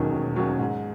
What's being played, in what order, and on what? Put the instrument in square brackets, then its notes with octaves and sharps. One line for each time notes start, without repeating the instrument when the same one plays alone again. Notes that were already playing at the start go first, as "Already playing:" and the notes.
Already playing: [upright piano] E1 D#2 D#3 F#3 C#4
E1
D#2 D#3 F#3 C#4
G#2